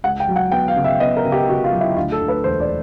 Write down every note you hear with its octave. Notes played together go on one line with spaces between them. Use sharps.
C#2 F#5
G5
F#3
F#5
B3 G5
F5
C#3
E5
B3 D#5
A#4
C#3
G4
C#3 F#4
F4
F#3
E4
D2 F4
A4
D2
B4
E1 C5
D5